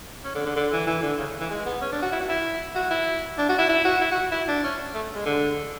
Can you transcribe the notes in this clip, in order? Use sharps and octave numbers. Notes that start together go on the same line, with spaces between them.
C#4
D3
D3
D3
E3
E3
D3
C#3
E3
G#3
B3
C#4
D4
F#4
E4
F#4
E4
F#4
E4
D4
F#4
E4
E4
F#4
E4
F#4
E4
D4
C#4
A3
G#3
D3